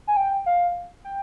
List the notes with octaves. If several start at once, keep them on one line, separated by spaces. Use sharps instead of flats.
G#5
G5
F5
G5